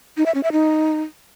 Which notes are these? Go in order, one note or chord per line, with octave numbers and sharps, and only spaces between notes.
D#4
E5
C#4
E5
D#4